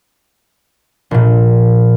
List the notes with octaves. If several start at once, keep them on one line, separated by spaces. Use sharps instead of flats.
A#1 A#2